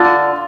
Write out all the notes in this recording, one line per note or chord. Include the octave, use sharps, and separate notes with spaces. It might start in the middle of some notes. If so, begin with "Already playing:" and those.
Already playing: D3 F4